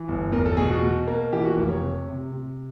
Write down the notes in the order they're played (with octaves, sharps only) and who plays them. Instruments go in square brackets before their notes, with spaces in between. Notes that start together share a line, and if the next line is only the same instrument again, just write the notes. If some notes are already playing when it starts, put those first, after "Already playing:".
Already playing: [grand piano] E3
G1
E2 A#4
A4
B2 G#4
F#4
B2
A#3
E3 G4
F#4
F1 G4
C#5
C3
C3
C3